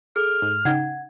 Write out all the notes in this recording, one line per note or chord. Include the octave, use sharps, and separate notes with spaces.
G#4 A4 F6
G#2
C#3 D#4 F#5 G5 G#6